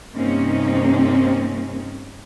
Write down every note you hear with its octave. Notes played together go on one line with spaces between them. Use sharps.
G2 C3 A#3 C4 C#4 D#4